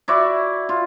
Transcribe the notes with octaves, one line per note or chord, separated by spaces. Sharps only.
E4 F#4 D5
F4